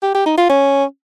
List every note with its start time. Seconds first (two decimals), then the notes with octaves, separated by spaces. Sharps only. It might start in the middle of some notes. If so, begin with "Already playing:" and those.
0.02 G4
0.14 G4
0.26 D#4
0.37 F4
0.49 C#4